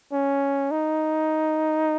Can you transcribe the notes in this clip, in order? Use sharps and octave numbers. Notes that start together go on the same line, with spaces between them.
C#4
D#4